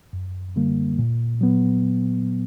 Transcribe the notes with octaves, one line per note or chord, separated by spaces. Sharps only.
F#2
D3 G3 A#3
A#2
F#3 B3